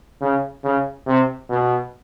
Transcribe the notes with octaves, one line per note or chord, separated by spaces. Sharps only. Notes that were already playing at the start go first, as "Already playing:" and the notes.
C#3
C#3
C3
B2